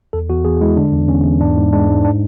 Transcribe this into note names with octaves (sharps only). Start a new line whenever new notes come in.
E2 A4
E2 F#4
E2 G#4
G#3 E4
D3 D4
E2
E2 C#4
E2
G#2 D4
G#2
G#3 D4
G#2
D4